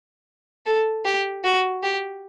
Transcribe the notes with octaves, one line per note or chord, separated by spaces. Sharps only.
A4
G4
F#4
G4